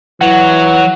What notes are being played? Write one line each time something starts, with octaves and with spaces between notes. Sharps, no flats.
E3 F#3 F#5